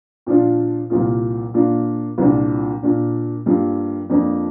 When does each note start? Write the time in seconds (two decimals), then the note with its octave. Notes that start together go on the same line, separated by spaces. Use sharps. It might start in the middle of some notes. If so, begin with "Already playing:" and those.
0.27 A#2 F3 D4 F4
0.90 C2 A#2 F3 A#3 F4
1.54 A#2 A#3 D4 F4
2.18 C2 A#2 F3 A#3 D4
2.83 A#2 A#3 D4
3.46 G2 G3 A#3 F4
4.10 F2 F3 A#3 D4